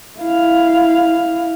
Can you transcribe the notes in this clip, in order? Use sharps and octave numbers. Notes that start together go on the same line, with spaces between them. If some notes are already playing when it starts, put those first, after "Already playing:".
E4 F5